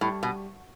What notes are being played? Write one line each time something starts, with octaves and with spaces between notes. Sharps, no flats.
A2 G3
B2